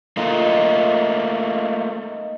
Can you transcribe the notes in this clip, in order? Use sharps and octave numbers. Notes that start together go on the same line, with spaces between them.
A3 A#3 D#4 F4